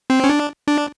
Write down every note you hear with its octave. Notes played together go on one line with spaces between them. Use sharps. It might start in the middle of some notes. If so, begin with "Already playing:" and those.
C4
C#4
D4
D4